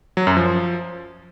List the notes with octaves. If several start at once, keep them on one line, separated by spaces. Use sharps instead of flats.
F#3
F#2
F3